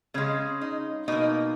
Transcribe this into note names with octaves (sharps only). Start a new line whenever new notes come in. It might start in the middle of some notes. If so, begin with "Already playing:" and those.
C#3 G#3 C#4
D#4
B2 A#3 D#4